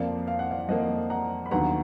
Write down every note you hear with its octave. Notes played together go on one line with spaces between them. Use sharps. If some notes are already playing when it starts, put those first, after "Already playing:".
Already playing: F2 F3 A#3 D5 F5
F5
F#5
D5 F5
F2 F3 A#3 D#5 F#5
F#5 A#5
B5
D#2 D3 F#3 B3 F#5 A#5